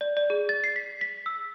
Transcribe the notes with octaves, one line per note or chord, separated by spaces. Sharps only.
D5
D5
G#4
A6
C7
B6
B6
E6